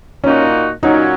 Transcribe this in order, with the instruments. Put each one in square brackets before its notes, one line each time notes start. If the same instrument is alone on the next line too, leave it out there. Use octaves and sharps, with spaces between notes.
[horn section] A#2 A#3 D#4 F#4 [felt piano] C#4
[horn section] A#2 F#3 C#4 [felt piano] D#4